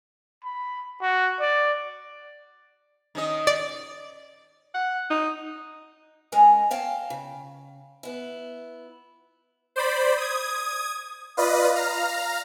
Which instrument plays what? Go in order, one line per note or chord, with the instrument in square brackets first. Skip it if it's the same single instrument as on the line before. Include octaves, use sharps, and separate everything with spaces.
[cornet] B5
F#4
D5
[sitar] D#3 C#4 D#5
[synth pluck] D5
[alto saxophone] F#5
D#4
[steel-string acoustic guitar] G#3 C#4 A#4 D#5 G#5
C#5 F5 G5 A5
C#3
B3 E4
[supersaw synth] C5 D5 B5
D#6 G#6
F4 B4 D5 D#5 B5 D#6
F5 A#5 F6